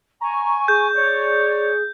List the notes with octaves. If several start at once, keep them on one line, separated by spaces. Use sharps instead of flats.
G#5 A#5 C#6
G#4 G6
C#5 D5